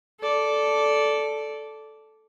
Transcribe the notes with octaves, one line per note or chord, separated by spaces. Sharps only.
A4 D5